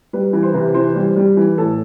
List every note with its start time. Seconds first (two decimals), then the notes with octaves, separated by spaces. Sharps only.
0.13 G3 B4
0.33 E3
0.43 C5
0.54 C3 B4
0.74 E3 C5
0.95 G3
1.16 G3
1.37 E3
1.57 A2 A4